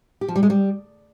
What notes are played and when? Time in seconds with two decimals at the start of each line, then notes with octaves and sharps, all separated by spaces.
0.21 G4
0.28 F3
0.36 G3
0.43 G#3
0.50 G3